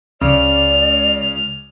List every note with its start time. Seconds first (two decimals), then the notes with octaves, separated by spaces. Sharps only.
0.21 C#2 C#3 D5 D6 F6